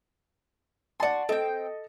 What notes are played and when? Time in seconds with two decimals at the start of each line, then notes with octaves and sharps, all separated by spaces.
1.00 F#4 D5 A5 C6
1.29 C4 A4 D#5 G5